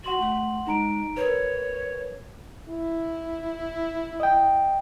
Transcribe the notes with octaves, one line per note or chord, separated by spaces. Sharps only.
F#4 F#5 C6 F#7
A3
G#3 D#4 A#5 D7
A#4 B4 C#5
E4
D#5 G5